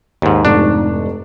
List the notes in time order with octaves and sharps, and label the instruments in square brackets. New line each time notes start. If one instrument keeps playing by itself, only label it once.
[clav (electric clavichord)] D#2 G#2
[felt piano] F1 G#2 C#6 [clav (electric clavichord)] D4